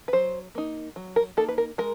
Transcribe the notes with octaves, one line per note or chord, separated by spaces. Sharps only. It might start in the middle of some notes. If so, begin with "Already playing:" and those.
B4
F#3 C5
A#3 D#4
F#3
A#4
A#3 D#4 A4
B4
A#4
G#3 A#4